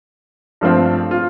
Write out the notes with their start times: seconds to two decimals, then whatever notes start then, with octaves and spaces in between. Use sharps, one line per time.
0.61 G2 F3 A3 C4
1.11 F4